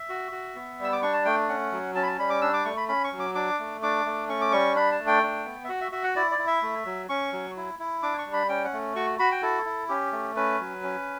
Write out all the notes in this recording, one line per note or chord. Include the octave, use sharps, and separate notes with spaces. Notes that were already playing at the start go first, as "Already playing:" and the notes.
Already playing: E5
F#4
F#4
B3
G3 E6
D6
D4 C#6
A5
A3 G5
C#4 F#5
F#3
C#4 A5
B5
A5
G3 B5
D6
D4 E6
D6
A3 C#6
B5
C#4 B5
C#6
F#3
D6
D4 D6
A3
D4 D6
A3
C#4 C#6
D6
G3 C#6
D4 B5
A5
A3
G5
D4
B3
E5
F#4 F#5
E5
F#4 E5
F#5
E4 D5
D5
E4
E5
A3
F#3
C#4 C#6
F#3
E4
E4
D4 D6
C#6
G3
B5
C#4 G5
F#5
A3
F#4 C#6
F#4 B5
G5
E4 A4
E4
C#4 G4
A3
C#4 B4
F#3
C#4